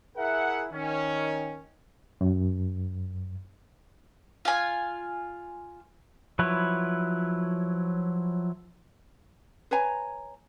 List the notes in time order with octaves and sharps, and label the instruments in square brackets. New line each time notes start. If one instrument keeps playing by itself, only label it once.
[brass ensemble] E4 G#4 A#4 E5 F#5
D#3 C#4
[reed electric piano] F#2
[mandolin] F4 G#5
[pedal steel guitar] F3 F#3 E4 B4 C#5
[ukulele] B4 C#5 G#5 A#5